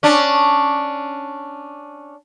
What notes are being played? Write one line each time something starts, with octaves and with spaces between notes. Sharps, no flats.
C#4 D4